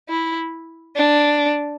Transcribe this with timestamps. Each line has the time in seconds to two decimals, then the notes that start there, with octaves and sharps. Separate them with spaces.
0.09 E4
0.96 D4